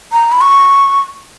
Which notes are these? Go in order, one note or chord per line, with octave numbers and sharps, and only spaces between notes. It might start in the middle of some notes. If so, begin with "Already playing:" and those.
A#5
B5
C#6